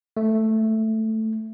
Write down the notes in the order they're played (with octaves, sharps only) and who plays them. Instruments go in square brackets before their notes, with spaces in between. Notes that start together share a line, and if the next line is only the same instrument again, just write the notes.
[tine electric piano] A3